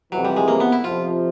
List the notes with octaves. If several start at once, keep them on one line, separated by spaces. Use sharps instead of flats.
F2 C3 E3 F#3
G3
G#3
A#3
B3
E4
F2 C3 F3 F4